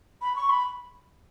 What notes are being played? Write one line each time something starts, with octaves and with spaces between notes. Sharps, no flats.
B5
C#6
B5